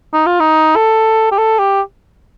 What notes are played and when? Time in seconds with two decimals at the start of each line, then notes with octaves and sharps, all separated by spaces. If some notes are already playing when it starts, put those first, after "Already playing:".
0.13 D#4
0.26 F4
0.40 D#4
0.76 A4
1.32 G4
1.39 A4
1.59 G4